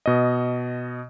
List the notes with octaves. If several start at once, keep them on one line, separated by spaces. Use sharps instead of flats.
B2 D#5